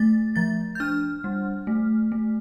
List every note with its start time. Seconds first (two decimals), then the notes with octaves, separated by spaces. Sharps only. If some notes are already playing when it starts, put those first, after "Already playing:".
Already playing: A3 A6
0.36 F3 A6
0.75 G6
0.80 D4 F6
1.24 G3
1.67 A3
2.12 A3